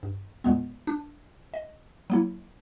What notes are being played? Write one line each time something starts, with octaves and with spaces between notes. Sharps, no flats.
G2
E2 A#2 G#3 B3
D4
D#5
F#3 A#3 E4